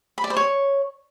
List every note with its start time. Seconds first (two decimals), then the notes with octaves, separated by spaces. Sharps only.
0.18 B5
0.24 D5
0.30 C5
0.37 C#5